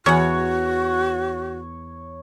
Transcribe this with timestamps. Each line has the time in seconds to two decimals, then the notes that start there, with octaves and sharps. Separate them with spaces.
0.06 E2 F#4 C#5 F#5